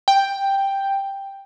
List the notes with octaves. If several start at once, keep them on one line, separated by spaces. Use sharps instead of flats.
G5